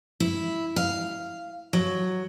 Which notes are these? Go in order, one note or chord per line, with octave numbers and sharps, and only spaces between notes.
E4
F5
F#3